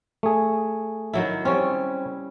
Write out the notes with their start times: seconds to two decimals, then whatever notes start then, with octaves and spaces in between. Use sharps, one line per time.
0.23 A3 G#4
1.13 D#3 F#3 E4
1.45 G3 C4 C#4 C#5